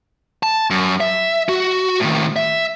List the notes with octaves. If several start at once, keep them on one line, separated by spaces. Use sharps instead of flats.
A5
F#2
E5
F#4
A2 D#3
E5